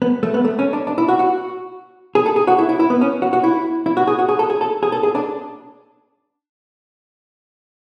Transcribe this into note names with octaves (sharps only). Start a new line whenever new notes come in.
B3
A3
B3
A3
C#4
D4
D4
E4
F#4
F#4
G#4
A4
G#4
F#4
E4
E4
E4
B3
C#4
F#4
F#4
E4
E4
F#4
G#4
F#4
G#4
A4
G#4
A4
G#4
A4
G#4
D4